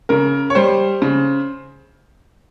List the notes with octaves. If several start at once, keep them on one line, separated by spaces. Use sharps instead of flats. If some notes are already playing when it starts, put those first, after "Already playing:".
C#3 A#4
C#5
G3 C5
C#3